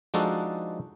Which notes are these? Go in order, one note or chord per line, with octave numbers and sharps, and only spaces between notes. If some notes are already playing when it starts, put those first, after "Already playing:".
F3 G#3 D4 D#4 F#4 A4